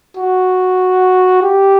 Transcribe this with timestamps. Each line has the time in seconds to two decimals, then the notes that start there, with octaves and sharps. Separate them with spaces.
0.17 F#4
1.43 G4